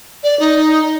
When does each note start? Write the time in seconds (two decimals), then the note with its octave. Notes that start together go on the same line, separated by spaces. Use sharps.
0.23 D5
0.40 D#4